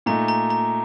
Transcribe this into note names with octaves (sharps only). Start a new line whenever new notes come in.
A#2 A3 D#4 A#5
A#5
A#5